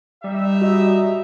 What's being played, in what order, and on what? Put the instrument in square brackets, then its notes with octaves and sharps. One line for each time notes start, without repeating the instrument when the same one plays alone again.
[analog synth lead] G3 [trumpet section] D#4 G4 E5
[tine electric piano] F#4 D#5